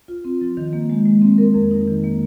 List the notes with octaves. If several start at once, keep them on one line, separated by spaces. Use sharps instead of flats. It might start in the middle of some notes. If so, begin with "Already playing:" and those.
F4
C4
F3
D#3
A#3
G#3
G#3
C4
A#4
F2
D#4
D#3
A#3